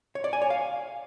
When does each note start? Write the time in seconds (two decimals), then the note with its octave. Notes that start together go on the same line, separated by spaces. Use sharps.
0.15 C#5
0.24 D5
0.33 G#5
0.42 C#5
0.50 F5